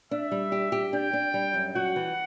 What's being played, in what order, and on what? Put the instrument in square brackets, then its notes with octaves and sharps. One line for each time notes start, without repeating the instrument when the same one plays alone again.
[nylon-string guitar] D4 [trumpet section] E5
[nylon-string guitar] G3
G4
G4
[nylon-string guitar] D4 [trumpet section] G5
[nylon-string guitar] D4
G3
F#2
[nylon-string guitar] F#4 [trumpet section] F#5
[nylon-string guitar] E3